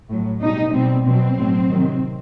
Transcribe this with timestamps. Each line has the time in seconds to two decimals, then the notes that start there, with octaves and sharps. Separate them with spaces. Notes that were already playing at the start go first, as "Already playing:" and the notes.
0.09 A2 F#3
0.41 B2 G3 D#4
0.73 B2 G3 C4
1.06 B2 F#3 C4
1.38 A2 F#3
1.70 C3 D#3 F#3